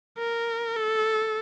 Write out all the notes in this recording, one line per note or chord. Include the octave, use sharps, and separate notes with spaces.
A#4
A4